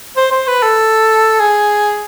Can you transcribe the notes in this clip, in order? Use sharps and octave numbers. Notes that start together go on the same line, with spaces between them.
C5
C5
B4
A4
G#4